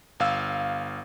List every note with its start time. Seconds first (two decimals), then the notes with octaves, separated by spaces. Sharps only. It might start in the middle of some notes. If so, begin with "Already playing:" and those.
0.20 G1 F5 E6